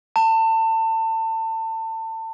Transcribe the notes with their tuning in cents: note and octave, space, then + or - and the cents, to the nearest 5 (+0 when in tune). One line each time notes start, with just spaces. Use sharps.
A5 +30